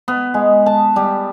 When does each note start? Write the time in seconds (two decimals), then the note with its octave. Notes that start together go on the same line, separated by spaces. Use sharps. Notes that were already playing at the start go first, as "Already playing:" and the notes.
0.08 B3
0.34 G#3
0.66 A5
0.96 G3